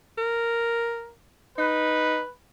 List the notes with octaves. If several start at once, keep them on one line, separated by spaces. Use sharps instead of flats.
A#4
D#4 B4